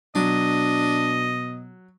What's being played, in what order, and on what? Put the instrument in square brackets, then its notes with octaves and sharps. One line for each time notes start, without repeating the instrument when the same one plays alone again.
[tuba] B2 [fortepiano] F#3 [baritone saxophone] D4 [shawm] D#5